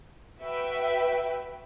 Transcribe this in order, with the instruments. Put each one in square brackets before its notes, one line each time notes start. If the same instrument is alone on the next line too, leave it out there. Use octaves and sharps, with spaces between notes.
[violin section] F#4 B4 E5 G5